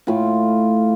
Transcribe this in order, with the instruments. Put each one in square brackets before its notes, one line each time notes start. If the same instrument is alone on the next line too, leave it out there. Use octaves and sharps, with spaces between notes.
[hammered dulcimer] A2 F4